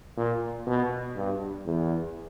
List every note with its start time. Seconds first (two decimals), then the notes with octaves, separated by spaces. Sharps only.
0.17 A#2
0.67 B2
1.16 G2
1.66 E2